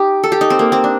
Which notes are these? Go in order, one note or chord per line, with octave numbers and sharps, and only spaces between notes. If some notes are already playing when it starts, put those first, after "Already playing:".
Already playing: D#4 G4
A4
G4
D#4
C4
A#3
C4
D4